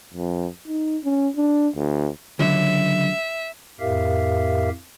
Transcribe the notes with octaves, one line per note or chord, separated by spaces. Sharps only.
F2
D#4
C#4
D4
D2
C#2 D3 F#3 E5
F2 A2 G4 A#4 E5 F5